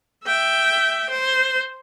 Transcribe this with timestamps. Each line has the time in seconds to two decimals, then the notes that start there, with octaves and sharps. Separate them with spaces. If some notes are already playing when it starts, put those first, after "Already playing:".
0.25 E5 G5
1.10 C5